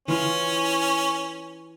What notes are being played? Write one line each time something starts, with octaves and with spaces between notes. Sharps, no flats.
E3 C#4 F4